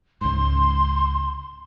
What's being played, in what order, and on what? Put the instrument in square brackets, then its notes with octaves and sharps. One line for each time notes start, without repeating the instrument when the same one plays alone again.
[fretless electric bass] C#2 G#2 [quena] C6